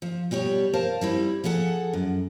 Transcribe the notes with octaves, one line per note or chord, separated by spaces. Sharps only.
F3
B2 G3 G4 C#5
A#4 C5 F5 A5
G3 C4 E4
F3 G#4 A4 F#5
F#2